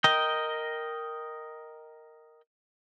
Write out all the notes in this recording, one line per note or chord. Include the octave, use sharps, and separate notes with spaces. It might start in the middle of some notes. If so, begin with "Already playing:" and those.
A#4 D#5 G5